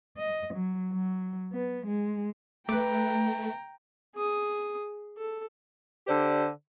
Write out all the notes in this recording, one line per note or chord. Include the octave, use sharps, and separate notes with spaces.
D#5
F#3
F#3
B3
G#3
A3 B4 G5 A#5 D6
G#4 D#6
A4
D3 G4 C5 D5